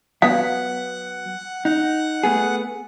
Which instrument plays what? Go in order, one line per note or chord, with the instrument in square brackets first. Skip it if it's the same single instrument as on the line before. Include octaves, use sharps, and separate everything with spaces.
[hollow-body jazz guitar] F#3 B3 [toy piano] F5 [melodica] F#5
[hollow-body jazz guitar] D#4 [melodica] F#5
[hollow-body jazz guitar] A3 B3 G#4